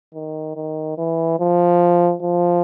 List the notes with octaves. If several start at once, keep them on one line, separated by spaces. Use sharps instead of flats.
D#3
D#3
E3
F3
F3